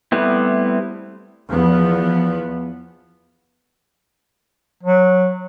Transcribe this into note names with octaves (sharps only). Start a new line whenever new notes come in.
G3 A3 B3 C4 E4
E2 F3 B3
F#3